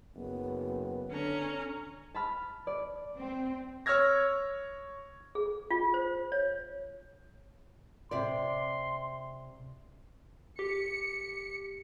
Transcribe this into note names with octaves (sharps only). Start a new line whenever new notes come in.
F#1 B3
D3 C#4 A#5
A5 B5 F6
D5
C4
C#5 E6 F6 G#6 A#6
G#4
F4
C5
C#5
C3 D5 C6
G4 C#7